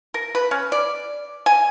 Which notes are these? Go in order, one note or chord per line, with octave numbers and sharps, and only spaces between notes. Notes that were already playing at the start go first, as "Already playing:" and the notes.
A#4
B4
C#4
D5
G#5